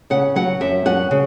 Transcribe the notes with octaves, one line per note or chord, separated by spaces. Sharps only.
C#3 F#5
F#3 F#5
F#2 E5
F#2 F#5
C#3